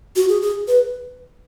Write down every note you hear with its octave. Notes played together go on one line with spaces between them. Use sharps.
F#4
G#4
G#4
B4